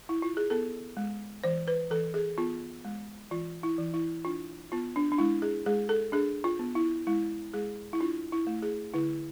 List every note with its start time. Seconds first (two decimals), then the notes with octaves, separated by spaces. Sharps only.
0.09 E4
0.22 F4
0.37 G#4
0.50 B3 A4
0.97 G#3
1.44 E3 C5
1.68 B4
1.91 E3 A4
2.14 G#4
2.38 B3 F4
2.85 G#3
3.31 E3 F4
3.63 E4
3.78 E3
3.94 E4
4.25 D4 F4
4.72 B3 F4
4.96 D4
5.12 D4
5.18 G#3 E4
5.42 G#4
5.66 G#3 G#4
5.89 A4
6.12 D4 G#4
6.44 F4
6.59 B3
6.75 E4
7.07 G#3 E4
7.54 G#3 G#4
7.93 E4
8.00 D4 F4
8.32 E4
8.47 A3
8.62 G#4
8.94 D3 E4